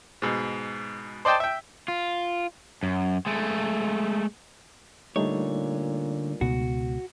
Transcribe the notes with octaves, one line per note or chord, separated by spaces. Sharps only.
G#2 B2
C5 D5 D#5 G5 A5
E5 G5
F4
F#2
G#3 A3
A#2 D3 G3 A3 D#4 C#5
C#2 B2 F#4